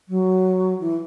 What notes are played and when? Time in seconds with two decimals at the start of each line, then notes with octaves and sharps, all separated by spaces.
0.08 F#3
0.80 E3